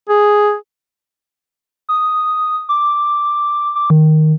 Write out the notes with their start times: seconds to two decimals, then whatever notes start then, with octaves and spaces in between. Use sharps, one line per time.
0.09 G#4
1.89 D#6
2.69 D6
3.75 D6
3.90 D#3